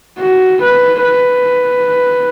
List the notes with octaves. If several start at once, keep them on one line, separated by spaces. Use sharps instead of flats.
F#4
B4
B4